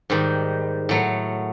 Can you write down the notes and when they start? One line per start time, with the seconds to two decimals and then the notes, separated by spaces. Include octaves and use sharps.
0.10 G#2 D#3 G3
0.89 A2 F#3 A3